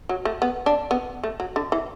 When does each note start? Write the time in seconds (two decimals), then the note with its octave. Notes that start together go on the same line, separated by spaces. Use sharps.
0.09 F#3
0.25 A3
0.42 B3
0.66 D4
0.91 B3
1.24 A3
1.40 F#3
1.56 D3
1.72 E3